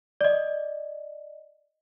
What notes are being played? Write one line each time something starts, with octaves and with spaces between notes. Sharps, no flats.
D5 D#5